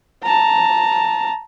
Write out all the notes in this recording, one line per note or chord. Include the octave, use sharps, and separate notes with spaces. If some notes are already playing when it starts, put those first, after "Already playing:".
A5 A#5